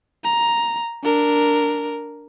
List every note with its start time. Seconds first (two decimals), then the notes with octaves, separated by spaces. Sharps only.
0.24 A#5
1.04 D4 A#4